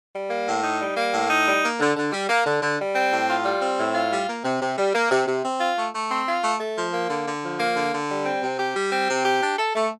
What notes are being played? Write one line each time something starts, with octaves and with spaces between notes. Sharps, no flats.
G3
A#3
A2
D#4
G3
A#3
A2
D#4
G3
A#3
D3
D3
G3
A#3
D3
D3
G3
C4
A2
F4
G3
C4
A2
F4
G3
A#3
C3
C3
G3
A#3
C3
C3
C4
F4
A3
A3
C4
F4
A3
A3
F3
A#3
D3
D3
F3
A#3
D3
D3
G3
C4
C3
G4
G3
C4
C3
G4
D4
A4
A3